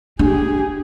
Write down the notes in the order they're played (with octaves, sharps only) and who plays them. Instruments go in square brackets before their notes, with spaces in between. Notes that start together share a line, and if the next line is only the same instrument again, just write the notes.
[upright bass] D4 [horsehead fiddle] G4 G#4